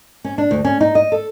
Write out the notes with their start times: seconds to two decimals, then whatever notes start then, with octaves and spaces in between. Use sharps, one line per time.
0.25 C#4
0.38 D4
0.51 D2
0.65 C#4
0.81 D#4
0.95 D#5
1.12 A4